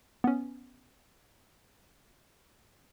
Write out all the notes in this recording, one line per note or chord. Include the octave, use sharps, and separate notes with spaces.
B3 C#4